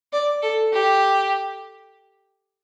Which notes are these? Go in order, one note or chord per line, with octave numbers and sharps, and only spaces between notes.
D5
A4
G4